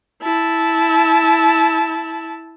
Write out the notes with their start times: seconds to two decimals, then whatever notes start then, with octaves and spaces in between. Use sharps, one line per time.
0.23 E4 A5